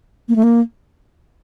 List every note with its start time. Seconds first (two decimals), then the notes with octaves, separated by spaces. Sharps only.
0.29 A#3
0.36 A3
0.43 A#3